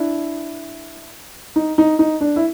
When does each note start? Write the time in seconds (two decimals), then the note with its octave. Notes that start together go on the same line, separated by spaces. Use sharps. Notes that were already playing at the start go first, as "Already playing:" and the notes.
Already playing: D4 E4
1.56 D#4
1.78 D#4
1.99 D#4
2.21 D4
2.36 E4